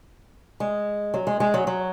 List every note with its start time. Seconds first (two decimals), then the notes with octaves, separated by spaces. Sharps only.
0.60 G#3
1.14 F#3
1.27 G#3
1.40 G#3
1.54 F#3
1.67 F#3